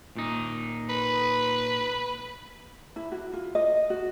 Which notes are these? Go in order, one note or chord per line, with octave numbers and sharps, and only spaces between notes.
A#2 D#4
B4
E4
F#4
F4
D#5
F#4